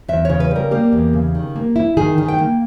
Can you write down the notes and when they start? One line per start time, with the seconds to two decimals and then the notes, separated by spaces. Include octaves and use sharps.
0.08 E2 E5
0.25 C#3 C#5
0.40 B4
0.51 G3 A#4
0.71 A#3 G4
0.93 E2
1.13 C#3
1.35 D#3
1.56 A#3
1.76 E4
1.97 D#3 G#4
2.18 D#3
2.29 G5
2.38 A#3